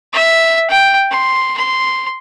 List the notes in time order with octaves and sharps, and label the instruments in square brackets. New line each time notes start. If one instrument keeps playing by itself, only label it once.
[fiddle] E5
G5
C6
C6